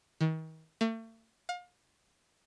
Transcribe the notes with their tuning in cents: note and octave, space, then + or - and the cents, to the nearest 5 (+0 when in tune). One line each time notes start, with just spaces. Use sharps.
D#3 +40
A3 +40
F5 +35